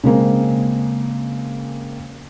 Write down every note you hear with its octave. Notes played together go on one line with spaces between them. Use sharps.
C#3 G#3 A#3 C4